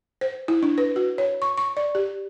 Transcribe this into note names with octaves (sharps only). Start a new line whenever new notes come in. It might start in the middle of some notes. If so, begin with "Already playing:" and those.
C5
E4
D4
B4
F#4
C#5
C#6
C#6
D5
G4